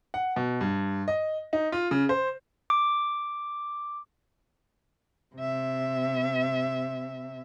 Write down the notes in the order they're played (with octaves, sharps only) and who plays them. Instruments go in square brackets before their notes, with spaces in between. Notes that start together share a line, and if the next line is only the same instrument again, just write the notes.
[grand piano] F#5
B2
G2
D#5
D#4
F4
C#3
C5
[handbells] D6
[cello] C3 E5